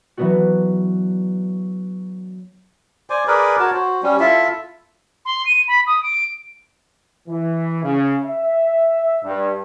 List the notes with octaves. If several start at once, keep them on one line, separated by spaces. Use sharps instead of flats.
E3 F#3 B3 D4 F#4
C5 D5 G#5
G#4 A#4 B4 D5
F#4 A#4 C#5 A5
F#4 C5
G3 C#4
E4 F4 A4 E5
C6
D#7
B5
D#6
D7
E3
C#3
E5
G2